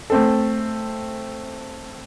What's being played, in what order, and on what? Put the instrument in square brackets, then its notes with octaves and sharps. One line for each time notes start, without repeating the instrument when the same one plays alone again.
[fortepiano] A3 C4 A4